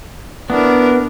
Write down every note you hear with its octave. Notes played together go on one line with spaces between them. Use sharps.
B3 D4 E4 A#4